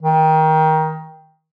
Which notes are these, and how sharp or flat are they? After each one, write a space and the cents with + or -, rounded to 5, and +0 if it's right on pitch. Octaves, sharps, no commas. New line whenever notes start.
D#3 +20